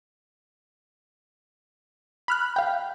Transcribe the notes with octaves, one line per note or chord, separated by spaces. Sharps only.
B5 F6 F#6
F5 G5